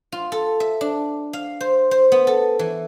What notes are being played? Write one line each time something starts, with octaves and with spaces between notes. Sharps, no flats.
F4
A4
E5
D4
F5
C5
C5
B3
A4
E3